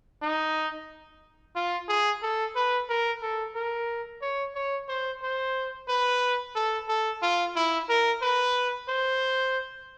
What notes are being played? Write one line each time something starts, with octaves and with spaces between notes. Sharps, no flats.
D#4
F4
G#4
A4
B4
A#4
A4
A#4
C#5
C#5
C5
C5
B4
A4
A4
F4
E4
A#4
B4
C5